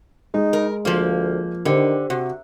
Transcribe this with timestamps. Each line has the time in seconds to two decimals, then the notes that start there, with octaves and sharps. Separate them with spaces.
0.34 G#3 D#4
0.53 A#4
0.85 D2 F3 A#3
1.65 D3 D#3 G4 C5
2.10 C3 F#4